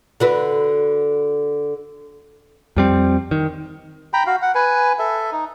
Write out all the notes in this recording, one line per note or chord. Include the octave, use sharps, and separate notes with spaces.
D3 F#4 B4
F2 G3 C4
D#3
G5 A#5 B5
F#4 F5
F#5
B4 G#5
A4 E5
D#4